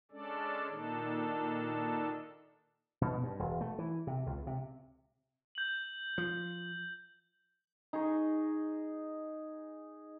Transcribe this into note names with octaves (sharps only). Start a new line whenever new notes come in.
G#3 C#4 D4 A4 D5
A#2 D#3 D4 D#4 A4
B2
G2
E1
A3
E3
C3
C#2
C3
G6 F#7
F3
D#4 G#4 A#5 C#6